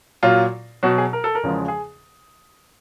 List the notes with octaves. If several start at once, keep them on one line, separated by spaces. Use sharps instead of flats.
A#2 F#3 F4
B2 F#3 F#4
G#4
A#4
A4
A#4
E2 C#3 F3 G#3
G#4